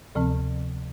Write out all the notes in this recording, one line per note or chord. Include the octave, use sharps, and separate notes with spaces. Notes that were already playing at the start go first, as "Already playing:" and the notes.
D2 C3 F3 C4